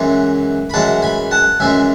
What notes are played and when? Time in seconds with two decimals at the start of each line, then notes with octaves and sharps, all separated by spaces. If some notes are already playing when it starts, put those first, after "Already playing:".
Already playing: F#2 E3 G#3
0.70 B5
0.74 F#2 E3 G#3 F#5 A5
1.02 G#5 B5
1.31 F#5 A5
1.60 F#2 E3 G#3 E5 G#5